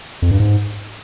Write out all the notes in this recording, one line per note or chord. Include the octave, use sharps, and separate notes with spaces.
F2
G2
G#2